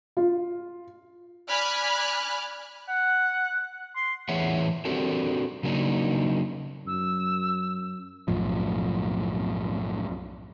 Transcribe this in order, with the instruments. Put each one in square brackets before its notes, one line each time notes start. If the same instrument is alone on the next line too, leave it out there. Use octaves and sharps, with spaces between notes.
[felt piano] F4
[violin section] D5 G#5 B5 F6 F#6
[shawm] F#5
C6
[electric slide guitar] A2 E3 G#4 C#5 E5 F#5
C4 D4 F#4 G4 A4 A#4
C#3 F#3 A#3 C4 D4 D#4
[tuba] F#2 [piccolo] E6
[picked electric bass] B1 F#2 A2 F3